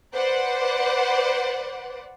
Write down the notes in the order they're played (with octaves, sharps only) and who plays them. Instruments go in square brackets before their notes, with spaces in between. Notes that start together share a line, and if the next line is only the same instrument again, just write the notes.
[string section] B4 C5 D5 F#5